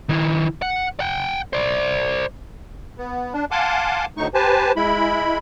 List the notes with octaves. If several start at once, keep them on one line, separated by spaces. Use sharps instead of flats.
D#3 E4
F#5
F#5 G5
C5 D5
B3
D4
F5 F#5 G#5 A5 C6 D6
D2 A2 A3 D#4 C#6
G4 B4 C5 G#5 A5
G#3 E4 B5